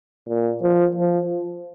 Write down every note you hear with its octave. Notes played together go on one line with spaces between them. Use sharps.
A#2
F3
F3